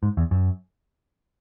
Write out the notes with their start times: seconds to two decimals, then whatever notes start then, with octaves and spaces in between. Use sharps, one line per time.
0.03 G#2
0.17 E2
0.31 F#2